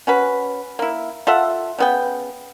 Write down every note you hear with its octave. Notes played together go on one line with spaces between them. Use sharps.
C#4 F#4 B4
A#3 E4
F4 A4 E5 F#5
C#3 B3 G5